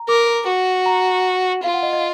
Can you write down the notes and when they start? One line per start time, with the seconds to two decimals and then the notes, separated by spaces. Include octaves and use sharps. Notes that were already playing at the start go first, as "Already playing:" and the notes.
Already playing: A#5
0.08 A#4 D6
0.47 F#4
0.86 A#5
1.64 F4 F5
1.74 F#5
1.83 D#5
1.93 D#5